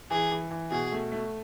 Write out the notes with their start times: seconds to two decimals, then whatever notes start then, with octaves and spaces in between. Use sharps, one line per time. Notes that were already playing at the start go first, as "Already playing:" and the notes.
0.11 E3 G#4
0.31 E3
0.51 E3
0.71 B2 G#4
0.92 A3
1.12 A3